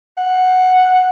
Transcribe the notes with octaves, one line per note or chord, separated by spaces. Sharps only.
F#5